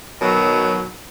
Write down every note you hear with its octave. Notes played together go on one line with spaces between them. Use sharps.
B2 D#3 F#3